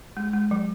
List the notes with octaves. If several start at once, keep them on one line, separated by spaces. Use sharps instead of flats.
G#3
G#3
F#3